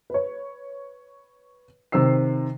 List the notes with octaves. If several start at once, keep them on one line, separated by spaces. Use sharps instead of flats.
B4 C#5
C3 D#3 C4 E6 C7